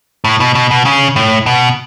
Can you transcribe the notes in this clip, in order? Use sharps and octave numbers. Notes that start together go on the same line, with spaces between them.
A2
B2
B2
B2
C#3
A2
B2